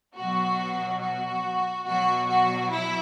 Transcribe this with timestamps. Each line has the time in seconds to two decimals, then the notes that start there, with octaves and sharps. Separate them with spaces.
0.17 B2 F#3 F#4
1.03 F#4
1.86 B2 F#3 F#4
2.29 F#4
2.71 E4